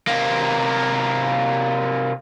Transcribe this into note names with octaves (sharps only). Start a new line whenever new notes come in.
C3 A#3